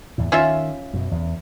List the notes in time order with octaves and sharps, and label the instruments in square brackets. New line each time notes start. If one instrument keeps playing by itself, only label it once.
[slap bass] E2 A2
[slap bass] D#3 [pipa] C#4 F4 E5
[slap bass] F#2 B2
E2